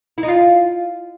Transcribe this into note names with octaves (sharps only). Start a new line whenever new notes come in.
E4
D#4
F4